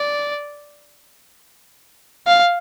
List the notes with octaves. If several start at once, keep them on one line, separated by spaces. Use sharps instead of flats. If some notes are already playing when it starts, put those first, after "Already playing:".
Already playing: D5
F5